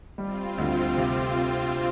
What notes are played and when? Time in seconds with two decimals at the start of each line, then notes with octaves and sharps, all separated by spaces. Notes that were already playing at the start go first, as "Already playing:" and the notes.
0.18 G3 C4 F4
0.58 D2
0.97 C3